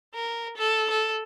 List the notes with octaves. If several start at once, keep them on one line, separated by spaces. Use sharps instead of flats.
A#4
A4
A4